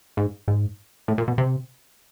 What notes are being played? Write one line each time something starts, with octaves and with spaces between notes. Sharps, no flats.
G#2
G#2
A2
A#2
B2
C3